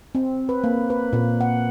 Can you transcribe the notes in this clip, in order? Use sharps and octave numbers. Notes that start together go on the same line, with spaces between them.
C4
B4
A#3
B4
A#2
F#5